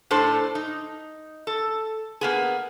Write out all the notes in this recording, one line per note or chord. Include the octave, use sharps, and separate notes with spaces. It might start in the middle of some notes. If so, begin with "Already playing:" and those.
A2 D4 A4 C5
D#4
A4
A#3 B3 G#4